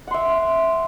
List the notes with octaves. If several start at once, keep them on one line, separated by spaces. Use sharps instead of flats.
E5 F#5 C6